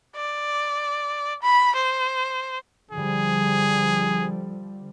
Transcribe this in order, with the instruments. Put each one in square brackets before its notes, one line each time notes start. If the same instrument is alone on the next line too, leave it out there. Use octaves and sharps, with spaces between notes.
[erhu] D5
B5
C5
[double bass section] D3 F3 G3 [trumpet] G#4